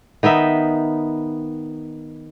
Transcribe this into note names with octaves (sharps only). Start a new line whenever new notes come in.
D#3 B3 D#4 E5